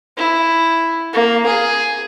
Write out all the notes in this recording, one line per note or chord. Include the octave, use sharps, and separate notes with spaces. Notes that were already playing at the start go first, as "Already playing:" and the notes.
E4
A#3
G#4